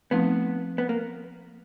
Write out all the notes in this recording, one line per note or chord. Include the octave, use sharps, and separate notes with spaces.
F3 A3 B3 C4 D#4
B3
A#3